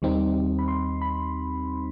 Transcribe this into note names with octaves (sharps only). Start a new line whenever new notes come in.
D#2 D#3 G3 C4 D#4
B5
C6
B5